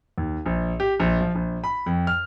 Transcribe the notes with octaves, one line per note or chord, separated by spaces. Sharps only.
D#2
A#1
G4
A#1
F3
A#1
B5
F2
F6